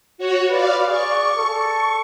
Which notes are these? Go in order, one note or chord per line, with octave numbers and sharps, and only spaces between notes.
F#4 C#5
F4 B4 D5 F5
G#4 D5 C#6
A4